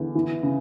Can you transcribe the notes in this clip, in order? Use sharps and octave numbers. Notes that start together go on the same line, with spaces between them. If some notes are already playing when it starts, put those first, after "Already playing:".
Already playing: E2 D3
E3
C#3